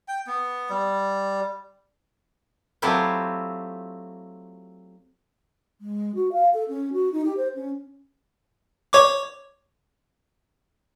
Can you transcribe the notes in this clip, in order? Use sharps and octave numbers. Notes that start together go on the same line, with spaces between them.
G5
B3
G3
F#3 A3 C4 E4 F4 G4
G#3
F#4
F5
A4
C#4
F#4
D#4
G4
C5
C#4
C#5 C#6 D6